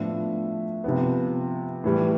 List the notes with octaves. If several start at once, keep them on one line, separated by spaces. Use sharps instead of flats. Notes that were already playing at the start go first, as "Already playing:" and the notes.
Already playing: A2 F3 B3 D4 E5
C3 F3 B3
A2 E3 G3